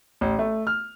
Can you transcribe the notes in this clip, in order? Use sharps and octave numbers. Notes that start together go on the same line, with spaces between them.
A1
A3
F6